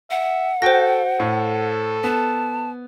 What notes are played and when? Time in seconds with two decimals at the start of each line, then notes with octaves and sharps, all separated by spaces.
0.11 E5 F#5
0.62 F#4 A4 C5 G5 A#6
1.20 A2 A4
2.04 B3 A5